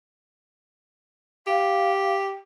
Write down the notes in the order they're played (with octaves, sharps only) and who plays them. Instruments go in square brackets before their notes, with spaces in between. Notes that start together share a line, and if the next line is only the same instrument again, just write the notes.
[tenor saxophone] G4 [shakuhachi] F5